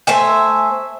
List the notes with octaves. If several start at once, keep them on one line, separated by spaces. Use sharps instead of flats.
A3 C5 E5 G#5